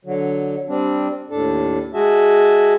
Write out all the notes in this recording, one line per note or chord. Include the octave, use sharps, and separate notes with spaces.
D3 F#3
G3 C4 D4
D#2 A2 D4 A4
G#3 F#4 G#4 E5 A5